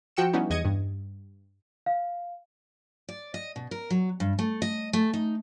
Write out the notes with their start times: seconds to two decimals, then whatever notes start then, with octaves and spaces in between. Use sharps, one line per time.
0.17 F3 F#4 G5 E6 C#7 E7
0.33 G3 B3 C#4 D#4 E4
0.50 E2 D#5 G#6 A#6 C#7 D#7
0.65 G2
1.86 F5
3.09 D5
3.34 D#5
3.56 B2
3.71 A#4
3.90 F#3
4.20 G2
4.39 A3
4.62 D#5
4.93 A3
5.14 D#4